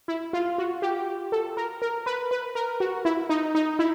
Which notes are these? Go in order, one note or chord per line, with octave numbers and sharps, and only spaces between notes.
E4
F4
F#4
G4
A4
A#4
A#4
B4
B4
A#4
F#4
E4
D#4
D#4
E4